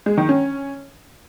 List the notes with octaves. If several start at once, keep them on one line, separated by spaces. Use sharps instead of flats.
G#3
D#3
C#4